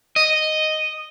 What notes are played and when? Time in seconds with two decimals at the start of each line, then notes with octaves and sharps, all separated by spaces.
0.16 D#5